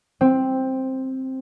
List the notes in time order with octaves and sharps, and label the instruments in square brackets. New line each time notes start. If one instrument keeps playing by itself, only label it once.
[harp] C4